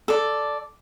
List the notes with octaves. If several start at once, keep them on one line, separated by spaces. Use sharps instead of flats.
A4 D5